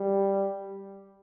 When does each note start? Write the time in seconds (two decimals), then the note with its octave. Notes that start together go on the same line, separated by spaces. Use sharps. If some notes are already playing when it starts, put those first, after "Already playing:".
Already playing: G3